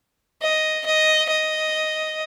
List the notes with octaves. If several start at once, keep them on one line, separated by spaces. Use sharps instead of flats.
D#5
D#5
D#5